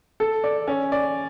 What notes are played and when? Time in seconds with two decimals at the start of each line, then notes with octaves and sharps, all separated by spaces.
0.20 A4
0.44 D5
0.67 C#4
0.92 D5